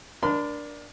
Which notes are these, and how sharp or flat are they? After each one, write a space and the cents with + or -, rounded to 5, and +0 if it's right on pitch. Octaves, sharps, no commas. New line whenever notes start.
D4 +0 A#4 +30 C6 -40